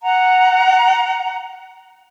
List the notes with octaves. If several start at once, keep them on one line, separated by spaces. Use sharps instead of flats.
F#5 A#5